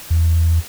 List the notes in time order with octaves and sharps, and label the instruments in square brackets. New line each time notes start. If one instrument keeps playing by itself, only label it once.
[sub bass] E2